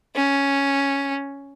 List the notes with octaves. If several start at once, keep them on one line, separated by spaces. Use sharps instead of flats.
C#4